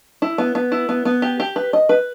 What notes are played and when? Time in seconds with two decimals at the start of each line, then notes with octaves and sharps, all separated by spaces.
0.22 E4
0.38 B3
0.55 B3
0.72 E4
0.89 B3
1.05 B3
1.22 G4
1.40 G4
1.56 B4
1.73 D#5
1.89 B4